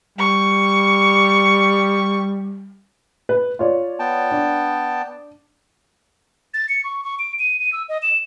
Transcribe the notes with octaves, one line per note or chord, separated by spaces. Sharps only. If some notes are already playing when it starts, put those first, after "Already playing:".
G3 C#6
B4
F4 C#5 D5
B3 G5 A5
D4
A6
C#7
C#6
C#6
D7
D#7
D#7
E6
D#5
E7